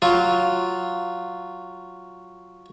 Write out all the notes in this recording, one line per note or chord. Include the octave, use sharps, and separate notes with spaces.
F#3 F4